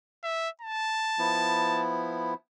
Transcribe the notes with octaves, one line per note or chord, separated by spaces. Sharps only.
E5
A5
F3 B3 E4